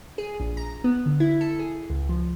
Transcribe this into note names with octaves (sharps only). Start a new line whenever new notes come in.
G#4
A#1
A#5
B3
D3
E4
A4
G#4
C#2
F3